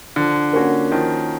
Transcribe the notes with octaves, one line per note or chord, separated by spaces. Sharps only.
D3 F3
A#3 C#4 F#4
D#3 F3